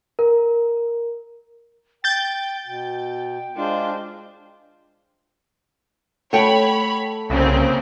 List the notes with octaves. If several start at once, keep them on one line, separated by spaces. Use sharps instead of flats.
A#4
G5 G6 A6
B2 G5
G#3 D4 F4 C5
A3 C#5 F#5 G5 B5
C2 C#3 A#3 C4